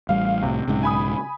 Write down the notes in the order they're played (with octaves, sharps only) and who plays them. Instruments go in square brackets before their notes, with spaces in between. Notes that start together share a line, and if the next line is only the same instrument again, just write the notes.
[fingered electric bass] A1 G3 [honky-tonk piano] F5
[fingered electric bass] C2 A2 [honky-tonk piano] C3
[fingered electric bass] B1 G#2 C#3
[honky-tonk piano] G#5 B5 D#6